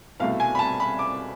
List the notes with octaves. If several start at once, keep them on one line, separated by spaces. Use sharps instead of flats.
C2 B2 A3 F5
G#5
B5
A5
B5
D6